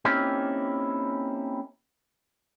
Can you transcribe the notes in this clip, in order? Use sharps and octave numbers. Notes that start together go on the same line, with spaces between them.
A#3 C4 C#4 D#4 E4 G4